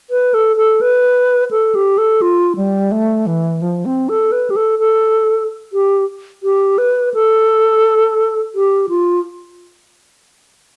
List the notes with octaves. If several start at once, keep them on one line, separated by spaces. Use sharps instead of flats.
B4
A4
A4
B4
A4
G4
A4
F4
G3
A3
E3
F3
C4
A4
B4
G4
A4
A4
G4
G4
B4
A4
G4
F4